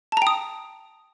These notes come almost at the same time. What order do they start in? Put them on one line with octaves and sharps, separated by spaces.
A5 A#5 G5 D#6